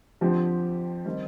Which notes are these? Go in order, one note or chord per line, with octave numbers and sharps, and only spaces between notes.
F2 D3 F3 C4 G4
D#3 G3 C4